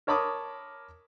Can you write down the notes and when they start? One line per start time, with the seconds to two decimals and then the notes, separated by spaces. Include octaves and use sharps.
0.07 A#4 C#5 A5 B5 D6 D#6